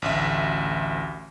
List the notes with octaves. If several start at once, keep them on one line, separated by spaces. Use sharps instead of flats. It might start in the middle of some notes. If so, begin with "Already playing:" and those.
A1 D2 E5